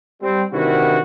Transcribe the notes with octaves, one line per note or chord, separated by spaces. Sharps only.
G3 C4
C3 D#3 E3 D4 E4 F#4